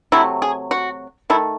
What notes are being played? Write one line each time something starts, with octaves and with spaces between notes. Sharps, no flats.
C3 F#3 A3 E4
G#4
F#4
D#3 A3 E4